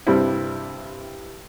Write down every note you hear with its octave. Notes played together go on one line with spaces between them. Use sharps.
G2 C3 G3 C4 E4